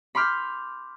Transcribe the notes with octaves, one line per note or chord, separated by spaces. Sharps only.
B5 C6 D6 F6 G6